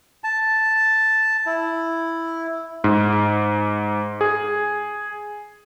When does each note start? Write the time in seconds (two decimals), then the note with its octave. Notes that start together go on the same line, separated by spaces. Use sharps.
0.24 A5
1.46 E4
2.84 G#2
4.21 G#4